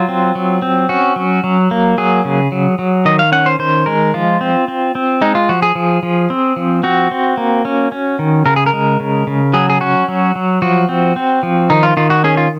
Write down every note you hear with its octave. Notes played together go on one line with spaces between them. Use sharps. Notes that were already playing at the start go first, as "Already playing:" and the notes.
Already playing: F#3 F4
C4
F#3
C4
C#4 F#4
F#3
F#3
A#3
F#3 G#4
C#3
F#3
F#3
D#3 D#5
F5
C#4 F#5
C5
D#3 C5
G#3 A#4
F3 F4
C4
C4
C4
G#3 D#4
F4
F3 F#4
G#4
F3
F3
C4
F3
C4 F#4
C4
A#3
C#4
C#4
D#3
C#3 A#4
G#4
A#4
G#3
C#3
C#3
F#3 G#4
G#4
C#4 F#4
F#3
F#3
F3 F#4
C4
C4
F3
D#3 D#4
F4
D#3 F4
F#4
C#4 G#4
F4